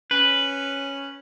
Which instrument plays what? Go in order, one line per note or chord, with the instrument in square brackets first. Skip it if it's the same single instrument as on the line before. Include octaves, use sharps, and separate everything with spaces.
[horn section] C#4 [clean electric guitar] B4